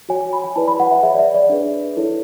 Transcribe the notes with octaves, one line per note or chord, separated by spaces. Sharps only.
F#4 C#5 G#5
G#5
B5
G#5
E4 G#4 B4 D5 A5
B5
F#5
E5
G#4 C#5 E5
D5
E5
D5
D4 G#4 B4
E4 A4 C#5